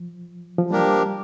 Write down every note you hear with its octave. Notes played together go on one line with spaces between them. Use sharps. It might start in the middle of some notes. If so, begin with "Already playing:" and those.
Already playing: F3
F3
F3 G3 A#3 D4 G4 A#4